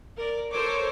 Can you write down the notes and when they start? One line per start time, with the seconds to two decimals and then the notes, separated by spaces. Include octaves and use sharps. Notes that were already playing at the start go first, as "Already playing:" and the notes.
0.17 A#4 D5
0.51 A4 A#4 C5 C#5 D6